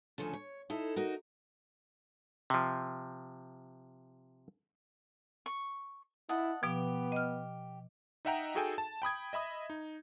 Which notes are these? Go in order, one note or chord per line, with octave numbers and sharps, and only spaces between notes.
D2 C#3 F3 C#4 A4
C#5
D#4 E4 A4
D#4 F#4 A#4
C3 F3
C#6
E4 D#5 F#5 A5
B2 F3 B3 G4
D#5 F6
D#4 D#5 E5 F#5 G5 A#5
D#4 F#4 G#4 A4 G5 G#5
A5
G5 B5 D#6 G#6
D#5 E5 B5 D#6
D#4